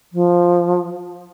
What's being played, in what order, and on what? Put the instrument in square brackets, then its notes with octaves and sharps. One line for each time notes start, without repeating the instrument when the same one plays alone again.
[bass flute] F3